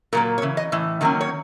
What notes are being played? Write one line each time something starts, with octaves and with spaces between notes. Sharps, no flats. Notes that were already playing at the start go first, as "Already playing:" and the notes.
A#2 F#3 A#3 A#4
C#5
C#3 E3
D#5
A2 E3
D#3 F#3 A#3 C#4
C#5